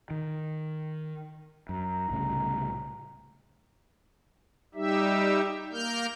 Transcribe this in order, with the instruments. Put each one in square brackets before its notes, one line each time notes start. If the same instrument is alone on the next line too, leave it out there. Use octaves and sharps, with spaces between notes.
[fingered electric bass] D#3
[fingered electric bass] F#2 [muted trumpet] A#5
[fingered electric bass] C2 A2 C#3
[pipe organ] G3 D#4 G4 E5
A#3 A#4 F6 G6